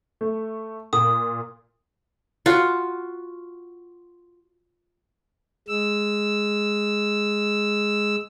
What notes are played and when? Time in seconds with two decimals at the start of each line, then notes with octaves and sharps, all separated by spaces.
0.21 A3
0.93 A#2 D#6
2.46 F4 F#4
5.68 G#3 E6